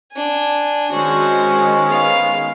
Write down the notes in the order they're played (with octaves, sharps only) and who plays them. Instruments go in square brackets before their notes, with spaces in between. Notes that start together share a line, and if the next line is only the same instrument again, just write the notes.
[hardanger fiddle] D4 G#5
[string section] D#3 G#3 [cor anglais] C#4 [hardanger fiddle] F#4 C5
[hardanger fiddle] B3 F5